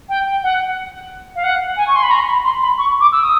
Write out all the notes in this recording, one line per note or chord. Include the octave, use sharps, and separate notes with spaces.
G5
F#5
F5
F#5
G#5
C#6
C6
B5
A#5
B5
C6
B5
C#6
D6
E6
D#6